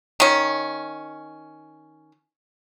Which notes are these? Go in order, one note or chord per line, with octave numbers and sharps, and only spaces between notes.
D#3 C#4